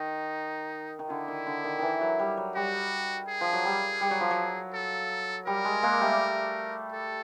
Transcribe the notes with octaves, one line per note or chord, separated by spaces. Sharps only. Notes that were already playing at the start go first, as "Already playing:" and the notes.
Already playing: D#3 D#4
D#3
D3 E4
D#3
D3
D#3
D#3 E3
F#3
G3
F#3
G3 F#4
G#4
F3
F#3
G3
G3
F#3
F3
F#3
A4
G3 A#4
G#3
G#3 A#3
G3 A3
A4